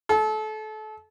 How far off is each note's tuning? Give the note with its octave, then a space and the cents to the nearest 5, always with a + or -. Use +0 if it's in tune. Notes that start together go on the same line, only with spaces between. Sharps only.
A4 -30